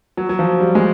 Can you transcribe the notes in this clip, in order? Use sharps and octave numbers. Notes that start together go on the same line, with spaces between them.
F#3
F#3
F3
G3
G#3